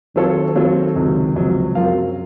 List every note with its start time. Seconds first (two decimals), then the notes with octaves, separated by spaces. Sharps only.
0.15 D#3 F#3 C4 F4 A4 C#5
0.55 D#3 F#3 C4 F4 A4 C#5
0.95 C#2 C3 F#3
1.36 C#2 C3 F3 F#3
1.75 F#2 F#3 C4 F4 A#4 F5